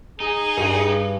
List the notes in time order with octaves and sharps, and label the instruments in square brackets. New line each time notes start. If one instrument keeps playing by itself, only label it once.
[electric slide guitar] D#4 [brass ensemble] G#4
[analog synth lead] G2